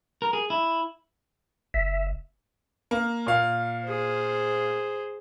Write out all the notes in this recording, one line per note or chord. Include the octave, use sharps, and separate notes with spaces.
A#4
G#4
E4
F#1 E5
A#3
A#2 F5
G#4 C5